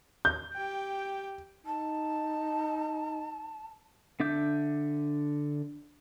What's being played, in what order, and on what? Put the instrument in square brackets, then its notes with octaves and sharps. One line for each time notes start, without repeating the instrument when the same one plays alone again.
[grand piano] G6
[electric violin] G4 G5
[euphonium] D#4 [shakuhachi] A5
[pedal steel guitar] D3 D4 E5 D6 G6